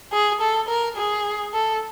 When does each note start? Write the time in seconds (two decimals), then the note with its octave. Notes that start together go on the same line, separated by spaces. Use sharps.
0.13 G#4
0.41 A4
0.68 A#4
0.97 G#4
1.54 A4